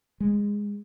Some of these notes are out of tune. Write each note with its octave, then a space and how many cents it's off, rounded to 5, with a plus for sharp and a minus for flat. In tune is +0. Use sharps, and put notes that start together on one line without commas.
G#3 -15